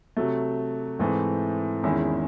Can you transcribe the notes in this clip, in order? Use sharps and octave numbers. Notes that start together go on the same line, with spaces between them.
C3 F#3 A3
G#2 E3 A3 C4
E2 D#3 G#3 C#4 E4